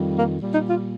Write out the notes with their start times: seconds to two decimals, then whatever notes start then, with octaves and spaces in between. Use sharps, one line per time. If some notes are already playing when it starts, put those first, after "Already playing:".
Already playing: F2 D#3 G3
0.16 A#3
0.38 A#2 G3
0.53 D#4
0.68 F4